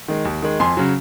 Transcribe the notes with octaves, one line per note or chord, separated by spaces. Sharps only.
D#3 G#3
D#2
D#3 G#3
F2 G#5 C6
C#3 F#3